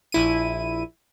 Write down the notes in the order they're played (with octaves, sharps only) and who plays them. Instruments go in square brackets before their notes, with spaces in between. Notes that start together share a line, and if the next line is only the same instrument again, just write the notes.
[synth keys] A#1 E4 D#7